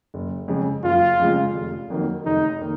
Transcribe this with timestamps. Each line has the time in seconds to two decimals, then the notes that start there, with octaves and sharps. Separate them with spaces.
0.14 F#1
0.48 F2 C#3 G#3
0.84 F#1 F4
1.20 F2 C#3 G#3
1.55 F1
1.90 F2 D#3 F#3 A#3
2.25 F1 D#4
2.61 D#3 A#3